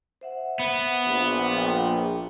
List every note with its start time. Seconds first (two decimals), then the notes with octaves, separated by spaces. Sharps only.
0.21 C5 E5 F#5
0.60 B3
1.05 A#1
1.52 F5 G5